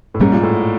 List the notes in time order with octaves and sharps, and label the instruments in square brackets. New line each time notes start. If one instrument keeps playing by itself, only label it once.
[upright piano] A2
[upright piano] G#2 [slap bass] B2 G3 A#3 C#4
[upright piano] A#2
A2